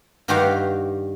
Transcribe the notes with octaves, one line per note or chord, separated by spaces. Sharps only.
G2 D#3 D#4 F#4 G4 F5